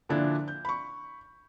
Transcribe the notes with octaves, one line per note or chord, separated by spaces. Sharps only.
A#2 D3 F3 D4 E4
G6
B5 C#6